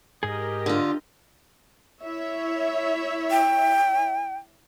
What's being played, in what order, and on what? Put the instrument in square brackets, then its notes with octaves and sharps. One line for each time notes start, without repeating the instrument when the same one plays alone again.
[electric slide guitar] G#2 G#4 [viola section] G4 A#4 D#5
[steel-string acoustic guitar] D3 F4
[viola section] E4 C#5 E5
[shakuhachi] G5